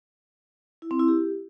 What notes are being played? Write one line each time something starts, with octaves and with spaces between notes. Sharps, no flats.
E4
C4
E4
G4